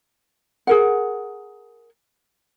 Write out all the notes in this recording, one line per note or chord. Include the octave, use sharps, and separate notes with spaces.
G#4 A#4 F#5